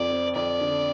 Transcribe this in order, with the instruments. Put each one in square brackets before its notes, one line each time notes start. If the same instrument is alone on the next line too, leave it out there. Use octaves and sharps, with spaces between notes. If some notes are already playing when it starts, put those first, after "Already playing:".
Already playing: [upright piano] F2 F3 [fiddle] D5
[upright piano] C4
[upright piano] F2 [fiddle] D5
[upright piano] D3